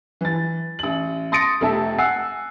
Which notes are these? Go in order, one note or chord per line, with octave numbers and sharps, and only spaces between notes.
E3 A6
A1 F#7
C6 D#6 A6 A#6 C#7 D7
F1 C3 A3 E5 A5
F#5 G#5 E6 C7